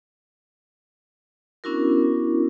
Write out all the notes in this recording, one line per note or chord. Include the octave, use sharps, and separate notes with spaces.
B3 C#4 D4 E4 F#4 A#4